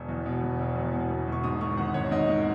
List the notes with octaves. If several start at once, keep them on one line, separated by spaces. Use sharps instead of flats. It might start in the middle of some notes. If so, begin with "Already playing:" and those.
Already playing: E1
E2
B2
E1
E1
E2
B2
E1
E1 C#6
G#2 D#6
D#3 C#6
G#1 F#5
G#1 C#5
G#2 D#5
D#3